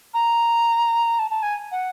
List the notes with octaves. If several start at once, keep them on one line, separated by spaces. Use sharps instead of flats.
A#5
A5
A5
G#5
F#5